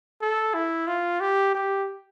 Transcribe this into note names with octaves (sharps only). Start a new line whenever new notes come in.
A4
E4
F4
G4
G4